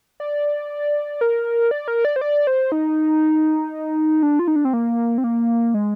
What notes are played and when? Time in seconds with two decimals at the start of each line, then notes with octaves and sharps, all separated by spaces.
0.20 D5
1.21 A#4
1.71 D5
1.88 A#4
2.05 D5
2.16 C5
2.21 D5
2.47 C5
2.72 D#4
4.23 D4
4.39 F4
4.48 D#4
4.56 D4
4.65 C4
4.73 A#3
5.18 C4
5.24 A#3
5.74 G#3